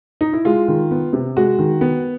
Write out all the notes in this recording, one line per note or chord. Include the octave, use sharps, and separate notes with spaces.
D#4
E4
G#3 F4
D#3
B3
C3
G#3 F#4
D#3
B3